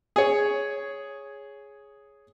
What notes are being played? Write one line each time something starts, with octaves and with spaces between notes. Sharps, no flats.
G#4 C#5